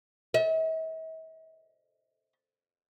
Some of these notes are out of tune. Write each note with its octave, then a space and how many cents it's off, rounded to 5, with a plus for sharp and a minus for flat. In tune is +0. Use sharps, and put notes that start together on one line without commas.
E5 -45